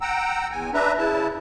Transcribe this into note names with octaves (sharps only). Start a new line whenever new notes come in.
F#5 G5 A#5 E6
E2 G#5
D4 B4 E5 A#5
C#3 E4 A5